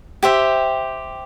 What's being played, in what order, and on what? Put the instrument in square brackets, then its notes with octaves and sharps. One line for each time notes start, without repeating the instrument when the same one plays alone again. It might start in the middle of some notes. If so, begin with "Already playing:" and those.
[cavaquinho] G4 C5 E5